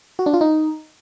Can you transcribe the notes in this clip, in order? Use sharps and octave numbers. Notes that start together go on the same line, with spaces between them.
F#4
D4
F4
D#4